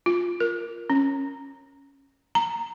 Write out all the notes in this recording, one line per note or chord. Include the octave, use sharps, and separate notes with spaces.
F4
A#4
C#4
A#5